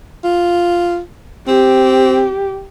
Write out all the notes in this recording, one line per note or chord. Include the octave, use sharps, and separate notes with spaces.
F4
C4 G4